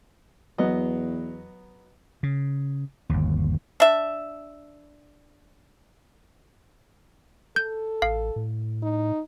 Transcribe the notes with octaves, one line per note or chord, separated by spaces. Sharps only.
E2 F#3 B3 D#5
C#3
G1 D#2
D4 E5
A4 G6
A1 F5
A2
D#4